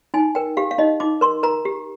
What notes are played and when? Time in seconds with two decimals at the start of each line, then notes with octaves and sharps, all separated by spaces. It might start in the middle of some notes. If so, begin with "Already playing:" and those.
0.14 D#4 G#5
0.35 A#4 G5
0.57 G4 F5
0.71 F5
0.78 D#4 D#5
1.00 D#4 D6
1.21 A#4 C6
1.43 A#4 A#5
1.65 G4